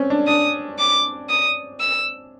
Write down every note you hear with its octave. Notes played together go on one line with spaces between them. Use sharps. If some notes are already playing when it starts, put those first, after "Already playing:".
Already playing: C4 C#4
D4
D4 D#6
D6
D#6
E6